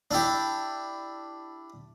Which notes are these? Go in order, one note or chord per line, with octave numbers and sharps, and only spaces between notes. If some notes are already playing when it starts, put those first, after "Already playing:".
D4 E4 G4